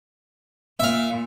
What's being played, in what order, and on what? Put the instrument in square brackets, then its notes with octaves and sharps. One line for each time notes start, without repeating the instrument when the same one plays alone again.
[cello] A#2 [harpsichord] E5 F5